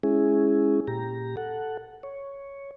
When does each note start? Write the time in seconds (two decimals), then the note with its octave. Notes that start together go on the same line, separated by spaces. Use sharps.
0.04 G#3 C#4 E4 G#4
0.88 A#2 G4 A#5
1.37 A4 F#5
2.03 C#5